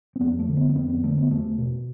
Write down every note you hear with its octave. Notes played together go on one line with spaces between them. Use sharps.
C4
F2 B3
A3
D3
B3
B3
F2 C4
B3
D3 A3
B3
E2 A3
B2